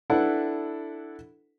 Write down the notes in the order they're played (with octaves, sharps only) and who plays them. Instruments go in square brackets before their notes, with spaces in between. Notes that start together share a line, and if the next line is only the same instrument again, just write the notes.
[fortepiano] D4 E4 A4 B4 F#5